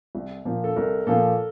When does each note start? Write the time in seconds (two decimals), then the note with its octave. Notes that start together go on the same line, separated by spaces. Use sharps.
0.15 C2
0.45 A#2 F3 A#3
0.64 A4
0.76 C2 A#4
1.07 A#2 F3 A#3 A4